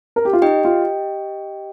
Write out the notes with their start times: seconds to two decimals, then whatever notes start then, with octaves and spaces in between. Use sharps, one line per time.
0.16 A#4
0.25 G4
0.33 F4
0.42 D#4 G4 D#5 G5
0.65 F4